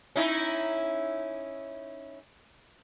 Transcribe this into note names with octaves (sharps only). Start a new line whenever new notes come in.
C#4 D#4 E4